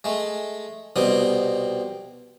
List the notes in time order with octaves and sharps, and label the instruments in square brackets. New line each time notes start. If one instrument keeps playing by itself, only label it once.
[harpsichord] G#3 A3
C2 B2 G3 C4 D#6